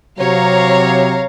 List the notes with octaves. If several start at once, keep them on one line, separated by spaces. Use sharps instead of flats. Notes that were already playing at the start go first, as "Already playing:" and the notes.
C3 F#3 C#5 F5 A#5